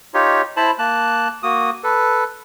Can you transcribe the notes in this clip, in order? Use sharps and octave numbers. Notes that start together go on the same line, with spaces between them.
D#4 F4 G4 C#5
E4 C5 A5 B5
A#3 A5 F#6
A#3 F#4 D#6
A4 B4